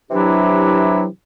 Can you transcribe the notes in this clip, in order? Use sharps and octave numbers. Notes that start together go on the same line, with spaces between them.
C3 E3 F#3 D4 E4 G4